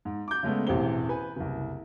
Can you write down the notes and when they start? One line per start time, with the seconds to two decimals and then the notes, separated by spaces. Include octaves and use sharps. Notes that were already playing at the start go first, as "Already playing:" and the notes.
0.05 G#2
0.28 D6 G6
0.43 C#3 G#3 A3 B3
0.67 E1 A1 C3 G4 C5 G7
1.09 B4 G#5
1.36 F#1 C2